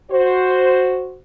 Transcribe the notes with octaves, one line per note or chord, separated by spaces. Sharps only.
F#4 C5